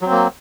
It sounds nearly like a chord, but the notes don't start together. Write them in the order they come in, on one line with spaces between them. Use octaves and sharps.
F#3 C4 A#3